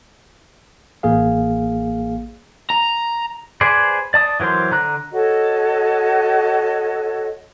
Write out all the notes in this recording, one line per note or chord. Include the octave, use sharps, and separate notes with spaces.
A1 A#3 G#4 F5
A#5
G#4 B4 C5 D5
D5 A5 D#6
E3 F#3 A#4 C5 C6
D3 A#5 F#6
F#4 A4 C#5 D#5